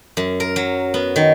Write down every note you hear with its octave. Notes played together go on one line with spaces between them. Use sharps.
F#2
A#4
F#3
B3
D#3